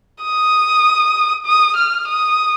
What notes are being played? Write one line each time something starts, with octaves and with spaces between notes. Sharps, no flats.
D#6
D#6
F6
D#6